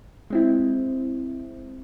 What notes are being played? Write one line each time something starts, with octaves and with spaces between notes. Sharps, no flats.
G#3 C4 E4